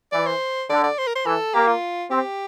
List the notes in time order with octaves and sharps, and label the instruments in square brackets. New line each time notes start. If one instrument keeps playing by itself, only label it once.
[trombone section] E3 [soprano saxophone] D5
[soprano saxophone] C5
[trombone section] D3 [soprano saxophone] D5
[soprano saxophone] D5
C5
A#4
C5
[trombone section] E3 [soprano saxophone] A4
[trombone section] A#3 [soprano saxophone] G4
[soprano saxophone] F4
[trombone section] C4 [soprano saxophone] G4